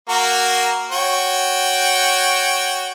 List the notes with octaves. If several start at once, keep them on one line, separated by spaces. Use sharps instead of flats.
A#3 F#4 A#4
F#4 C#5 G5